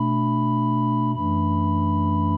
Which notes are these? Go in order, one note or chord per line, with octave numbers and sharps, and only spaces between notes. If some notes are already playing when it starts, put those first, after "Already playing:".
Already playing: B2 A3 D4 B5
F#2 E3 A3 D4 B5